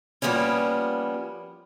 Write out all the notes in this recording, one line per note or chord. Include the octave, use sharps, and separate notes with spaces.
F3 G3 G#3 A#3 B3 C#4